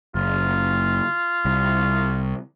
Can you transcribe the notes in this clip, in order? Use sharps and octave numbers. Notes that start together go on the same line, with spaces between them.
F#1 F4
C2